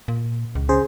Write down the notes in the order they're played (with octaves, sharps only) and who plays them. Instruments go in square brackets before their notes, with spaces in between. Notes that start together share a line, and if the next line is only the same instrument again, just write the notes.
[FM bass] A#2
C#2
[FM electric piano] C#3 G#4 C5